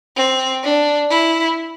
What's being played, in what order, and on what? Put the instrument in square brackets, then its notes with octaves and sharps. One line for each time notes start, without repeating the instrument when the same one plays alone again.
[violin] C4
D4
E4